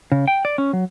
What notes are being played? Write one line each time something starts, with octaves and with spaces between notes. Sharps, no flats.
C#3
G5
D5
C#4
F#3